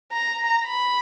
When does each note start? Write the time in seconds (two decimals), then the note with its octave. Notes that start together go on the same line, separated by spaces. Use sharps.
0.12 A#5
0.65 B5